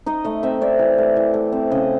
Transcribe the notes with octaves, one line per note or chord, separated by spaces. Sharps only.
D#4 D#5
A3 D#5
C4 E5
C4 D5
E3
A3
E3
A3
C4
C#3 D#5